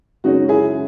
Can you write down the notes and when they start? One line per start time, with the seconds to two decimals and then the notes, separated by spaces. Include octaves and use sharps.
0.24 F#2 C#3 G#3 C#4 D#4 F#4
0.49 E4 G#4